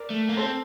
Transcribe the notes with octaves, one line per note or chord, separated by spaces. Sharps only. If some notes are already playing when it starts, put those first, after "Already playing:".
Already playing: A#4 D5
A3
A#3
C4 A4 C5